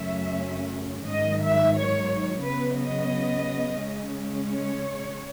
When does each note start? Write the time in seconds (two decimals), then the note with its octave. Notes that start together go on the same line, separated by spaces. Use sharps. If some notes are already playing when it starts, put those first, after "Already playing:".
Already playing: F#2 C#3 F#3 A3 C#4 E5
1.09 G#2 D#3 F#3 D#5
1.43 E5
1.76 C#5
2.44 C#3 F#3 B3 B4
2.78 D#5
3.80 C#3 G#3 C#4
4.47 C#5